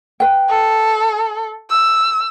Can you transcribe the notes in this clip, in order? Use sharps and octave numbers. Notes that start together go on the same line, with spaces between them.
B4 G5
A4
E6